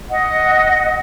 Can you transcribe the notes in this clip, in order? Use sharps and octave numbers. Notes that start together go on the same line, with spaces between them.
D#5 F#5